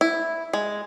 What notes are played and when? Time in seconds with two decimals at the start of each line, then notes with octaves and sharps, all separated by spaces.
0.01 E4
0.53 G#3